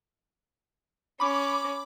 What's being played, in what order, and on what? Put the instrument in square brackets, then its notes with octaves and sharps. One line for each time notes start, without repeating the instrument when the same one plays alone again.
[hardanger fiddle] C#4 [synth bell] B5 D6